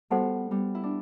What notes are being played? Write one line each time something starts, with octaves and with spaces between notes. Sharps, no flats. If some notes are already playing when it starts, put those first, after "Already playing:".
G3 B3 F#4 A4 C5 F#5 A5
G3 B3
E4
D4